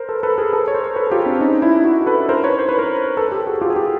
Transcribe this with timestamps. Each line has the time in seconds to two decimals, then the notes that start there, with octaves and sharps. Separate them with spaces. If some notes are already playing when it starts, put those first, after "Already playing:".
Already playing: A#4 C5
0.09 A4 B4
0.23 A4 B4
0.38 G#4 A#4
0.53 A4 B4
0.68 C#5
0.74 A#4 C5
0.96 A4 B4
1.07 G#4
1.11 F4 G4
1.26 C4 D4
1.41 C#4 D#4
1.62 D4 E4
1.84 E4 F#4
2.06 A4 B4
2.29 A#4 C5
2.44 B4 C#5
2.59 C5
2.69 B4
2.78 A#4 C5
3.17 A4 B4
3.32 G4 A4
3.47 F#4 G#4
3.61 F4 G4
3.70 G#4
3.76 F4 G4